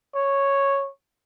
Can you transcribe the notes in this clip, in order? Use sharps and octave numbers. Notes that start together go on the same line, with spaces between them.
C#5